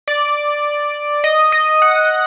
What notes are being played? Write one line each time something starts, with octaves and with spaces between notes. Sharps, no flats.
D5
D#5
D#5
F#5